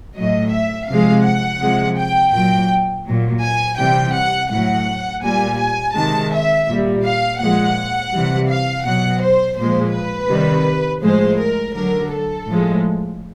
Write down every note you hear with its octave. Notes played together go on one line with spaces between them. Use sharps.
A2 F#3 D#5
E5
C3 F3 G#3 F5
F#5
C3 F3 G#3
G5
A#2 F#3 G5
A#2 F#3
G#5
C3 E3 G3 G5
F#5
A2 F#3 F#5
A#2 G3 G#5
G#5
C3 D#3 G#3 A5
E5
A#2 G3
F5
A#2 F3 G#3 F#5
C3 E3 G3
F5
B2 F#3 F#5
C5
A#2 F3 G#3 C5
B4
C3 D#3 G3
A2 F3 G#3 C5
A#4
D3 F#3 A#4
A4
A2 F3 G#3